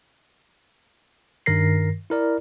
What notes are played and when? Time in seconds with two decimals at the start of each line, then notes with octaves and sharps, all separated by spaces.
1.46 G2 D#3 A#4 A#6 C7
2.10 E4 A#4 D5